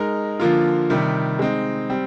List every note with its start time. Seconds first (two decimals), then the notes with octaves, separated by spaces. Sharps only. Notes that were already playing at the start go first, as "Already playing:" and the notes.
Already playing: G#3 D#4 A#4
0.40 D3 F3 A#3 F4
0.90 C3 D#3 G3
1.39 G#3 C4 D#4
1.90 G3 C4